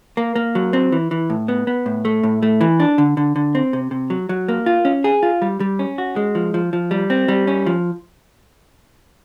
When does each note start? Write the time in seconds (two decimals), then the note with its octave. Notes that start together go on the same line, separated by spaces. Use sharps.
0.17 A#3
0.36 A#3
0.55 F#3
0.73 C4
0.92 E3
1.11 E3
1.30 A2
1.48 B3
1.67 B3
1.86 A2
2.05 A3
2.23 A2
2.43 A3
2.61 E3
2.80 D4
2.98 D3
3.17 D3
3.36 D3
3.55 C4
3.73 C3
3.91 C3
4.10 F#3
4.29 F#3
4.48 A#3
4.66 F4
4.85 C#4
5.04 G#4
5.23 F4
5.42 G3
5.60 G3
5.79 C#4
5.98 F#4
6.16 G#3
6.35 F3
6.54 F3
6.73 F3
6.91 G3
7.10 C4
7.28 G3
7.47 C#4
7.66 F3